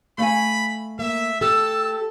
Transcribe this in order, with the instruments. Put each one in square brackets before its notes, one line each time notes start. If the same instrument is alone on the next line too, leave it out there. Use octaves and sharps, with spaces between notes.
[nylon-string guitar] A3 F5 G#5 [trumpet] B5
[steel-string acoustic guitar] A#3 [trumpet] E5
[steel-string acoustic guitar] G4 A4 [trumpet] A5 [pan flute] E6